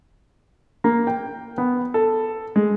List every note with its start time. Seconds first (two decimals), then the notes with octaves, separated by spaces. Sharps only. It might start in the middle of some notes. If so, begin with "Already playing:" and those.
0.84 A#3
1.07 G5
1.58 B3
1.94 A4
2.56 G#3